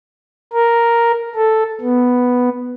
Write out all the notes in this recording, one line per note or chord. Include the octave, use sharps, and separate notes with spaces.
A#4
A4
B3